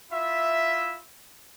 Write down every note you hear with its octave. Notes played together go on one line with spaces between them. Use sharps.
E4 F4 E5